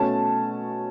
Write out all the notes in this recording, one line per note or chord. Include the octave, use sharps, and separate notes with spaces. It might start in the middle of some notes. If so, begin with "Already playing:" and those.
Already playing: B2 A3 C#4 A5